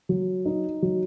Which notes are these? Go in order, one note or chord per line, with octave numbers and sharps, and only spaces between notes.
F#3
D#4
F#3